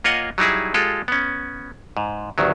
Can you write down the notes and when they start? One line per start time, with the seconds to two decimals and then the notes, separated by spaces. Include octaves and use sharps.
0.04 A#3 F4 C#5 D#5 F#5 G#5
0.38 F#3 G3 D#4 E4 G#4
0.74 G#3 F4 G4 A4
1.08 B3 C#4
1.97 G#2
2.38 G1 D2 D#3 F#3